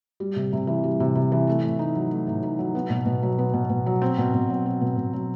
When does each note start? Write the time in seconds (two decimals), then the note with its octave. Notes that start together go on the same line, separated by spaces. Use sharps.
0.20 G3
0.36 C3
0.53 C3
0.67 E3
0.84 G3
1.00 C3
1.15 C3
1.32 E3
1.47 A3
1.63 A2
1.79 D#4
1.96 F#3
2.11 A3
2.27 A2
2.43 D#4
2.59 F#3
2.75 B3
2.90 B2
3.06 B2
3.23 F#3
3.38 B3
3.54 B2
3.70 B2
3.86 F#3
4.02 C4
4.18 B2
4.34 B2
4.50 F#3
4.66 C4
4.81 B2
4.97 B2
5.13 F#3